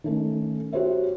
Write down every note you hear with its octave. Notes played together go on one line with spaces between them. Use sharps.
D#3 A3 C#4
F#4 G4 C5 C#5 E5